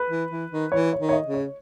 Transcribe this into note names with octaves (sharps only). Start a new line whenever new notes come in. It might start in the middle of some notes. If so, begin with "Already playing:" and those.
Already playing: B4
E3
E3
D#3
E3 C#5
C#5
D#3
C#5
D#5
C#3
C#5